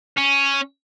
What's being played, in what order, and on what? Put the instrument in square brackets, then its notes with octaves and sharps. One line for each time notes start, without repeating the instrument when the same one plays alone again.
[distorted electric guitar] C#4